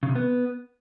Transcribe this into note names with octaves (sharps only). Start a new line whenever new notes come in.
C#3
C3
B3